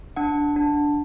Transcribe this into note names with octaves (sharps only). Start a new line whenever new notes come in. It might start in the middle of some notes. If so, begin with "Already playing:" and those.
D4 F#5
D4